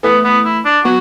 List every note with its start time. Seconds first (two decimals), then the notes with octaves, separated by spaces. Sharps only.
0.03 E3 A3 B3
0.24 B3
0.45 E4
0.65 D4
0.84 F#3 B3 F#4